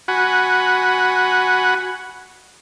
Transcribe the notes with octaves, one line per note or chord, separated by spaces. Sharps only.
F#4 F#5 G#5 B5